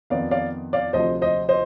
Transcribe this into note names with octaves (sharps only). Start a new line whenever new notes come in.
F2 D#3 B3 D5 F5
D5 F5
D5 F5
D2 C3 F3 C5 D#5
C5 D#5
C5 D#5